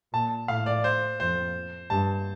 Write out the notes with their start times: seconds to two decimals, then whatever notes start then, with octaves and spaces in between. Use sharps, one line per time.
0.13 A#2 A5
0.48 A2 F5
0.66 D5
0.84 C5
1.20 F2 C5
1.90 G2 A5